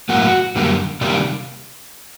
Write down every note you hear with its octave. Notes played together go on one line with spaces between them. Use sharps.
A2 F#3 A#3 F#4
F#2 D3 G3 A#3
C3 D#3 G3 A#3 D5